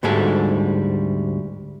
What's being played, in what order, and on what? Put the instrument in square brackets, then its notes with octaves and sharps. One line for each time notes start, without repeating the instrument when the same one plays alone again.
[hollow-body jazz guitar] D2 G#2 G3 G#3 A4 G#5